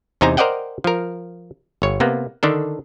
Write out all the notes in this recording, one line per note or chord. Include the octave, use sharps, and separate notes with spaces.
E2 C3 D#4 C5 G#5 A#5
A#4 C5 D5 D#5 F#5 G5
F3 A#4
G1 C#5
C3 A#3 B3
D3 D#3 D4 A4